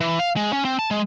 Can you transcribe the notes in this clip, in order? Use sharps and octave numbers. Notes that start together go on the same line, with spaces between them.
E3
F5
G#3
C#4
C4
A5
G#3